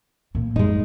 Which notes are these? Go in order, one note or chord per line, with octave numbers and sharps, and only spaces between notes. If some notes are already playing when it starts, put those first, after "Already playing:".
A2 A#3
F#2 G#3 D#4